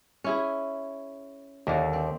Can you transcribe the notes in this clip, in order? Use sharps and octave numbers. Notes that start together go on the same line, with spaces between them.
C#4 E4 G#4
D#2 D3 A#3
C4